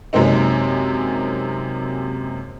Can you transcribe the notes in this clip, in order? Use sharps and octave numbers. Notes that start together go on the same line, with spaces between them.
F#2 C3 G#3 A#3 C4 D#4